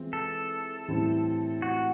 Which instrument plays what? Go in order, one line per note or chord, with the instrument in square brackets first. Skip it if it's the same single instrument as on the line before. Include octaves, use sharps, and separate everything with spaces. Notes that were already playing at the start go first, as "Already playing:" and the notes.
Already playing: [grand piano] E3 G#3 C4 F4
[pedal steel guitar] A4
[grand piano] A2 E3 G3 C4 E4
[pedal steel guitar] F#4